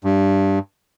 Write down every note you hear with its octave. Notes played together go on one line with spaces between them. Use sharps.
G2